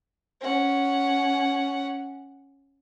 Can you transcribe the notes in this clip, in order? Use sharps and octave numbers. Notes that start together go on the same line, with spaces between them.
C#4 F#5